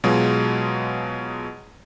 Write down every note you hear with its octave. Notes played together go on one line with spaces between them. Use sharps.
B2 F#3 G#3 F4 G#4